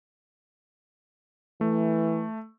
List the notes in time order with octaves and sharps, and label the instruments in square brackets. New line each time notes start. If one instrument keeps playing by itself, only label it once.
[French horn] E3 [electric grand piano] A3